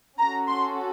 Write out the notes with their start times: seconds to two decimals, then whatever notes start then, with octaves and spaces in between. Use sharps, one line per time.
0.18 C#4 F#4 A4 A#5
0.48 C6